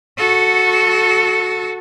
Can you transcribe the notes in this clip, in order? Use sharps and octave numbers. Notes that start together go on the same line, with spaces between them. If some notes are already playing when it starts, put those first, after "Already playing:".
F#4 A4